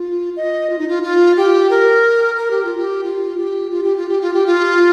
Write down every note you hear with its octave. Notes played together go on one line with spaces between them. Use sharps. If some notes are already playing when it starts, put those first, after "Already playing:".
Already playing: F4
D#5
F4
D#4
F4
F4
G4
A#4
A#4
G4
F4
G4
F4
G4
F4
G4
F4
G4
F4
G4
F4